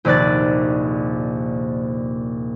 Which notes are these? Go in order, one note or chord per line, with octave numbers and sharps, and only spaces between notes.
A#1 D#2 C3 D5 F#6 A6